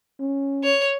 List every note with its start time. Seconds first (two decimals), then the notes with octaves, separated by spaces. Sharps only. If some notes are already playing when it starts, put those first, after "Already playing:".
0.20 C#4
0.64 C#5